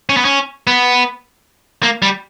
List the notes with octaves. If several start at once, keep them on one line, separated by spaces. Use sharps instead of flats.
C#4
B3
C#4
B3
A#3
G3